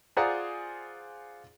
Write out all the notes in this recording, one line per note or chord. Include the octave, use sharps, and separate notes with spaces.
F4 G#4 C5 D5 F#5 A#5